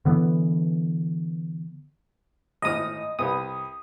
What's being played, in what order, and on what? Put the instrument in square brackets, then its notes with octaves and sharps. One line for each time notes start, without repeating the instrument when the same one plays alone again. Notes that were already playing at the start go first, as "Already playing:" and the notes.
[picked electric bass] D3 E3 B3
[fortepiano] G#1 A2 F6 [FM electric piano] D#5 D#6
[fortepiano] C2 B4 [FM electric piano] D#6